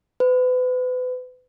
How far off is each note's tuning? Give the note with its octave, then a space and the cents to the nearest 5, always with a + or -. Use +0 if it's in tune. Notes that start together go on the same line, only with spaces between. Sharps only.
B4 +35